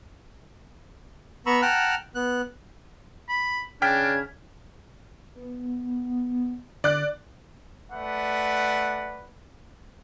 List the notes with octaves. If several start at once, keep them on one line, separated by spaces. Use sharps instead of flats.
B3 A#5 B5 C#6 E6
F#5 G5 A5 A#5 F6 F#6
B3 F#6
B5
C#3 D4 G5 F6 G#6 B6
B3
D3 D5 F#6
A3 B4 D5 F#5